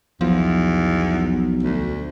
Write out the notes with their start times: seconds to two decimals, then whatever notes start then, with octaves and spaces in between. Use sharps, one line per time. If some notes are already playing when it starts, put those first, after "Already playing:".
0.21 B1 E2 F3
1.63 D2